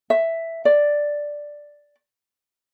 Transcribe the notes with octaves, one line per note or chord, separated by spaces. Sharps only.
E5
D5